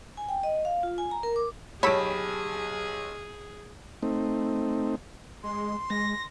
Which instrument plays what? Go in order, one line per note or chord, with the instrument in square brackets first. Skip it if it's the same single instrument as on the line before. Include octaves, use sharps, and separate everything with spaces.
[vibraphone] G#5
G5
D#5
F5
F4
G#5
A#5
A#4
D6
[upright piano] B1 G4 A5 [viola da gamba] G#4 [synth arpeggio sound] C#5 E6 [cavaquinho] B5
[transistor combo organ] A3 C4 D#4
[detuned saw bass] G#3 [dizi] C6
[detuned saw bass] G#3 [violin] A#6